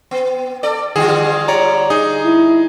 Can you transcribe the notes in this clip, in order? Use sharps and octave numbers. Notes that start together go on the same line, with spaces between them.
B3
A4 D5
D3 G3 F4 G#4
C#5 D5 A#5
D#4 G#4 D#6
E4